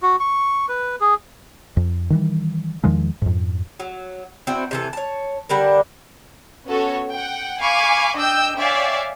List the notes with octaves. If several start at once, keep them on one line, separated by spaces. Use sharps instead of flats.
F#4
C#6
B4
G#4
F2
D#3 E3 G3
E2 D#3 F3 G#3
F2 G#2
F#3
C4 D4 E4 F#4
C3 E3 A4
C#5 A5
D3 G3 D4 A#4
B3 C#4 F#4 A4 C#5
F#5 G5
F5 G#5 B5 C#6 D6
D4 D#5 G5 E6 G6
C#5 D5 E5 F5 G5 G#5